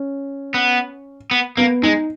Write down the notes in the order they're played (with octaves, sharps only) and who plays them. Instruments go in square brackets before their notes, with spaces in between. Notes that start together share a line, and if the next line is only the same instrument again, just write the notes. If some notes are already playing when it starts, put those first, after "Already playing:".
Already playing: [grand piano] C#4
[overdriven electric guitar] B3
B3
[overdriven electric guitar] A#3 [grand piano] B3
[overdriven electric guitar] G#3 [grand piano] D#4